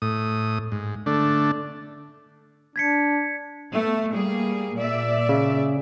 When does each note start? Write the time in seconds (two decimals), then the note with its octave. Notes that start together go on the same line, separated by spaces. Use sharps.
0.02 A2 D#6
0.72 G#2
1.06 D3 A3 D4
2.76 D4 G#6 B6 C#7
3.72 A3 B3
4.14 G3 A#3 G#4
4.75 A#2 D5 E5
5.29 C#3